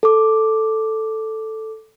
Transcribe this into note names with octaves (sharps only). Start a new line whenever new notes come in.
A4 D6